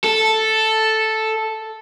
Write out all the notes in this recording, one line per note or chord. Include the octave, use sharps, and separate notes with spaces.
A4